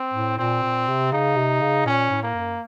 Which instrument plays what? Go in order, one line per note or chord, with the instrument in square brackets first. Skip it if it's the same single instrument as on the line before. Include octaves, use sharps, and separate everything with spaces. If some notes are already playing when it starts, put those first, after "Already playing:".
Already playing: [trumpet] C4
[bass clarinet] A2
[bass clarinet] A#2 [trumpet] C4
[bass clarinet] A#2
C3
[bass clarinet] C#3 [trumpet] D#4
[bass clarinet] C3
C#3
[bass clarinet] A#2 [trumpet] C#4
[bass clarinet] A2
[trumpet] A#3
[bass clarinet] F#2